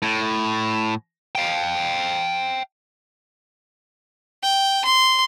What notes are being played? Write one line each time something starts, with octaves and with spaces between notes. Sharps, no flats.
A2
F5 G5
G5
C6